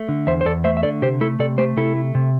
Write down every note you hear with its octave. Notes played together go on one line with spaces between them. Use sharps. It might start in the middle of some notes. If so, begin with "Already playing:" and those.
Already playing: A3
D3
E2 C5 E5
C5
E2 A4 D5
A3 C5 E5
E5
D3 A4 D5
C3 G4 C5
A3 E4 A4
C3 A4 D5
A3 G4 C5
C3 E4 A4
A3
C3